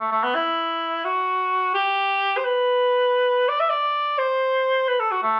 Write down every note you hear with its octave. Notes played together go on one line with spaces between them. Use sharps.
A3
A3
B3
E4
F#4
G4
C5
B4
D5
E5
D5
C5
B4
A4
F#4
A3